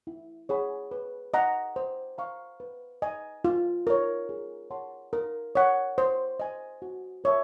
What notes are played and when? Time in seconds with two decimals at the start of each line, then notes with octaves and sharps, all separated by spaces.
0.07 E4
0.49 G#4 C#5 F#5 B5
0.91 B4
1.34 D#5 F#5 A#5
1.76 C5
2.18 F5 A#5 C#6
2.60 B4
3.02 D#5 G#5
3.45 F4
3.87 A#4 C#5
4.29 G#4
4.71 C#5 F#5 A5 C6
5.13 A#4
5.55 C#5 F#5
5.98 C5
6.40 D#5 G#5
6.82 F#4
7.24 A#4 C#5 E5 A5